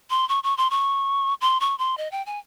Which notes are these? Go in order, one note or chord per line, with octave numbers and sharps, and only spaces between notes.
C6
C#6
C#6
C6
C#6
C6
C#6
C6
D#5
G5
G#5